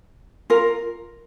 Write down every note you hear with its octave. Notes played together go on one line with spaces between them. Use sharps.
F4 A#4